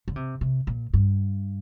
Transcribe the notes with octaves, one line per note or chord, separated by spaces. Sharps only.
D3
C3
C3
A#2
G2